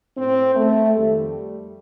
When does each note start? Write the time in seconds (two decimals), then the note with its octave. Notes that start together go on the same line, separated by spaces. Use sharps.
0.17 A2 C4
0.56 A3
0.95 F2 D#3 G3